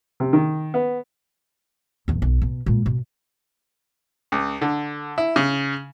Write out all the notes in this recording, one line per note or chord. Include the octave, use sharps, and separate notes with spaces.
C3
D#3
B3
D#1 E2
B1
B2
A#2 G#3
B2
C#2
D3
E4
C#3